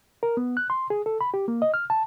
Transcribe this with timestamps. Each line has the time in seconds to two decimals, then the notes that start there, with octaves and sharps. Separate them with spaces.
0.23 A#4
0.37 B3
0.57 F#6
0.70 C6
0.90 G#4
1.06 A4
1.21 B5
1.34 G4
1.48 A#3
1.62 D#5
1.74 F6
1.90 A5